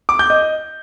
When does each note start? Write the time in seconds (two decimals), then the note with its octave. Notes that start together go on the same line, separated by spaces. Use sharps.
0.09 D6
0.19 G6
0.30 D#5